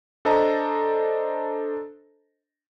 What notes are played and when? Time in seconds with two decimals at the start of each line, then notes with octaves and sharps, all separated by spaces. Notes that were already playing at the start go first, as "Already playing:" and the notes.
0.25 D4 A4 C5 D#5 A5 A#5